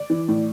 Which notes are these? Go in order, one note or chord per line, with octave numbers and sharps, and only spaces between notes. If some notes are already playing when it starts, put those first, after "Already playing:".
Already playing: D5
E3
A2